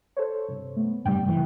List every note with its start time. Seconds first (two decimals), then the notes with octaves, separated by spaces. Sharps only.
0.17 A4 C5 C#5
0.48 G2 C3
0.77 A3 B3
1.06 G2 C3 G3 G5
1.25 F#1 E3